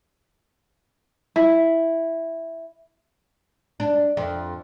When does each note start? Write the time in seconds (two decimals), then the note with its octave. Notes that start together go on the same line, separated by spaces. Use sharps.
1.36 E4
3.80 D4
4.17 F2